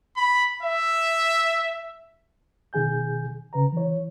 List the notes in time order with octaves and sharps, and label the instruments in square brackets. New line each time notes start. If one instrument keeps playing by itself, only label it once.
[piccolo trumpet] B5
E5
[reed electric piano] B2 D#3 G#4 G#5 G6
C#3 B4 A#5
E3 C#5